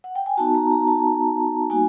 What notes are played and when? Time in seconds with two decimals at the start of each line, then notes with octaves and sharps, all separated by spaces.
0.04 F#5
0.15 G5
0.26 G#5
0.37 B3 D#4 F#4 A5
0.55 A#5
0.71 A#5
0.87 A5
1.70 G3 A#3 D#4 F#4 G#5